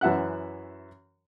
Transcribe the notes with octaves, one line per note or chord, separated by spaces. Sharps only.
F#2 E3 E5 F#5 F#6